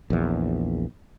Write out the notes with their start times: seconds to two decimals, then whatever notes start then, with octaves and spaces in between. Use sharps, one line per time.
0.10 A#1 E2